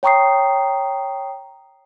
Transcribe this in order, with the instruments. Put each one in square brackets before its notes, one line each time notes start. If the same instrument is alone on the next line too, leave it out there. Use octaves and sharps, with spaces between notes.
[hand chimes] C#5 G5 A#5 C#6 D#6 C7